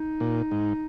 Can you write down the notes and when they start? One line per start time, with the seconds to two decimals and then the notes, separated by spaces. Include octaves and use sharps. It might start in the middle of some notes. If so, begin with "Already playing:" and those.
Already playing: D#4
0.20 A#2
0.51 G#2